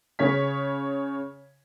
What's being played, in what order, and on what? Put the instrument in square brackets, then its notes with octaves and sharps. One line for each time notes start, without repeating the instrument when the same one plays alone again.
[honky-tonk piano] C#3 C#5 B6